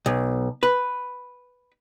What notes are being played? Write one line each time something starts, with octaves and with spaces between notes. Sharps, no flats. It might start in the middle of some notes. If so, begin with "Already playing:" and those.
B1
B4